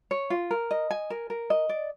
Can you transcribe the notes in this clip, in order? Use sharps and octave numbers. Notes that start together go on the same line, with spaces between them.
C#5
F4
A#4
D#5
G#5
A#4
A#4
D#5
D5